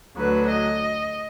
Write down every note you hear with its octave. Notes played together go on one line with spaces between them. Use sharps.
D2 D3 F#3 B4
D#5